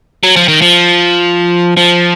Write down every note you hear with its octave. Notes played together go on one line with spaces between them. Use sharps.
F#3
F3
D#3
F3
F3